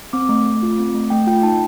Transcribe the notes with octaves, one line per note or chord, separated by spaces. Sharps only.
C4 D6
A3
A3
F4
C4
A3
A3 G5
F4 G5
D#4 A5